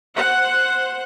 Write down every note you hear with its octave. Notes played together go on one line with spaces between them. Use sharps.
C5 F#5